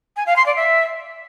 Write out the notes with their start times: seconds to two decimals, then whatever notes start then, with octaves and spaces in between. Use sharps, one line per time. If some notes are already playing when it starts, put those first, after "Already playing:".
0.16 G#5
0.26 F5
0.36 C6
0.46 D5
0.56 E5